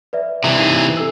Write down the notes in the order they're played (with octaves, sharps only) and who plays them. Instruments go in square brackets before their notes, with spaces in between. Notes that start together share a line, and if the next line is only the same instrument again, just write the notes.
[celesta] B4 D5 E5
[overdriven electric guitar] C3 E3
[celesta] D#4 C7 D#7
A4 E6